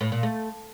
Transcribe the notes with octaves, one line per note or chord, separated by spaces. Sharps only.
A2
A#2
A3